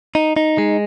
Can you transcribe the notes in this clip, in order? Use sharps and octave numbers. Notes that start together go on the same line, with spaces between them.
D#4
D#4
G#3